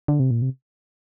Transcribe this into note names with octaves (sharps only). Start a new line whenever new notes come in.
D3
C3
A#2
C3